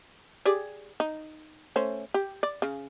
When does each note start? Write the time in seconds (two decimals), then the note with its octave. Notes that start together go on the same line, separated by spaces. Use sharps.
0.46 G4 G#4 D5
1.00 D#4
1.76 A3 C#4 C5
2.14 G4
2.43 D5
2.62 C#3